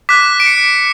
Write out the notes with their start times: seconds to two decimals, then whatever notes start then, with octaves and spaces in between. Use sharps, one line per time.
0.09 D6 F#6 B6
0.40 D7
0.46 C#7